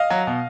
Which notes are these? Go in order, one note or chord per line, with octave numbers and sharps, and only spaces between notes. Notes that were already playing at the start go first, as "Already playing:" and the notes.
Already playing: D#5 F5
F#3
B2